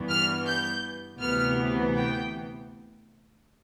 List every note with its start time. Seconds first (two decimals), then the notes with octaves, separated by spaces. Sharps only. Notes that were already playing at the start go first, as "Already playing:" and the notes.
Already playing: G2 E3 B3
0.10 F6
0.46 G6
1.20 D2 C3 E3 B3 F6
1.95 G5